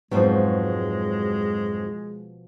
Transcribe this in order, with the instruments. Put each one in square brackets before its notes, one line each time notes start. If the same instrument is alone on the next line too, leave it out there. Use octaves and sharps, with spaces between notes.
[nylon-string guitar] F2 G#2 F#3 [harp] B2 F3 [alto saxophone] G#3